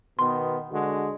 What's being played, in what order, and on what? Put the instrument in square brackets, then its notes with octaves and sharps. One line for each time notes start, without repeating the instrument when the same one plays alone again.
[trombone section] B2 D#3 B3 [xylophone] C6
[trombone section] D3 G#3 F#4